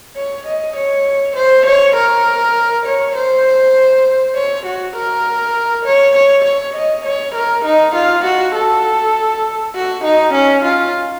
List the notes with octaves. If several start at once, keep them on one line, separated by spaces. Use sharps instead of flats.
C#5
D#5
C#5
C5
C#5
A#4
C#5
C5
C#5
F#4
A#4
C#5
C#5
C#5
D#5
C#5
A#4
D#4
F4
F#4
A4
F#4
D#4
C#4
F4